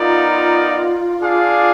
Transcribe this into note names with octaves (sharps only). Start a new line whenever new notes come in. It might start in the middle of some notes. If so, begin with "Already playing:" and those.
Already playing: B3 D#4 F4 A#4 D5
D4 G#4 D5 F5